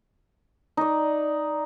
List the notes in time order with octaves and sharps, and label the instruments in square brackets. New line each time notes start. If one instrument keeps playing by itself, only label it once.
[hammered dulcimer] D#4 D5